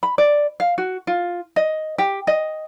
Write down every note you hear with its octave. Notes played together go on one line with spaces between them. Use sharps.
B5
D5
F5
F#4
F4
D#5
G4
D#5